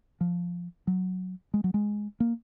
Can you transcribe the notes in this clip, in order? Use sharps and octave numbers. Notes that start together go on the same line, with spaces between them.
F3
F#3
G#3
F#3
G#3
A#3